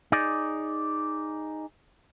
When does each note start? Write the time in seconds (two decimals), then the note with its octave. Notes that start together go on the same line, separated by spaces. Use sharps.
0.12 D#4 G#4 D5